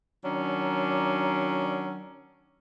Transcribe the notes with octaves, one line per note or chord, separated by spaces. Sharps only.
D#3 F#3 C#4 D4